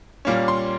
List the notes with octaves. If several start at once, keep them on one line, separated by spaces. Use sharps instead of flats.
A#2 G3 A#3 C#4
C6